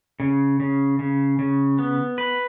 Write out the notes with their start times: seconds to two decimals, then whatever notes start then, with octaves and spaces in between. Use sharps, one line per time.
0.20 C#3
0.60 C#3
0.99 C#3
1.39 C#3
1.79 B3
2.18 B4